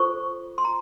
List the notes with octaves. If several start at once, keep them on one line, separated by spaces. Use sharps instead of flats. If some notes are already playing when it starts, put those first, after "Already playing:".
Already playing: F4 A4 C5 C#6
C6
A#5